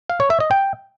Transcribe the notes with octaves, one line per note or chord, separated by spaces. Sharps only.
F5
C#5
E5
D#5
G5